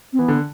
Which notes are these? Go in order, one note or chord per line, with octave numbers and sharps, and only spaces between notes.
C4
E3 B3
D3